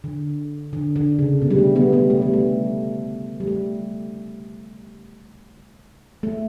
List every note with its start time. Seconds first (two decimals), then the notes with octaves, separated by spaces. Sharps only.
0.04 D3
0.73 D3
0.96 D3
1.19 C#3
1.42 B2
1.51 G3
1.58 A3
1.75 G3 B3
1.93 G3 B3
2.10 A3
2.22 G3
2.33 A3
3.40 G3
3.47 A3
6.23 A3